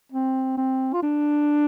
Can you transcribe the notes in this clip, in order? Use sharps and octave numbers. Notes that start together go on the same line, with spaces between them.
C4
C4
F4
D4